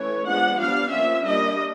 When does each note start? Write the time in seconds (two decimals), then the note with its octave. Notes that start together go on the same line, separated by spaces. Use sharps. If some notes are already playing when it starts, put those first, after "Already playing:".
Already playing: E3 A3 C#4 C#5
0.26 F3 G#3 B3 D4 F#5
0.58 G3 B3 D4 F5
0.91 F3 A#3 C#4 E5
1.23 G3 A#3 D4 D#5